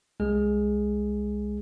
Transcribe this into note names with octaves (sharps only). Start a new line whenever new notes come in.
C2 G#3 G#4